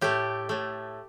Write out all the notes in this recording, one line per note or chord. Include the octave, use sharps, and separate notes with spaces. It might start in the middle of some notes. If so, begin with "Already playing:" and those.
A2 A3 G4
A2 A3